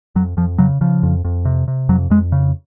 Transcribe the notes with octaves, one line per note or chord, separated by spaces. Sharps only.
F2 F#3
F2 F3
C#3 F#3
C#3 F3
F2
F2
C3
C3
F2 F#3
F2 G#3
C#3